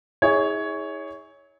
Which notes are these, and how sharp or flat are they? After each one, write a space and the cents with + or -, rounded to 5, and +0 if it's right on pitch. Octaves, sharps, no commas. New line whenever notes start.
E4 -45 G#4 -5 C#5 +10